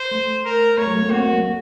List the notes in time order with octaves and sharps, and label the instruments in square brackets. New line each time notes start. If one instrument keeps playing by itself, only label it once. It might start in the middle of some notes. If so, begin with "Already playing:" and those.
Already playing: [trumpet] C5
[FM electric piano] A3
[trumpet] A#4
[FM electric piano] A3 [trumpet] C#5
[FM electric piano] F#3
A3
A#3
[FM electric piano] C4 [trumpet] F#4
[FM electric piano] A#3
F#3
A3